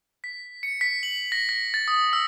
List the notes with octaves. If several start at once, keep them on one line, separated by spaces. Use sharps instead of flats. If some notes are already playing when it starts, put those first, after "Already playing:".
B6
C#7
B6
F#7
A#6
A#6
A6
D#6
E6